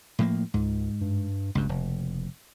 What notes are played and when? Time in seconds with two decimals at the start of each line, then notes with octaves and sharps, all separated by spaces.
0.19 A2 F3 A#3
0.54 C#2 G#2
1.01 G2
1.55 F#1 C#2 G2
1.69 F1